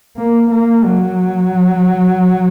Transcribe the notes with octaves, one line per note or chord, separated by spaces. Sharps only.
A#3
A#3
F#3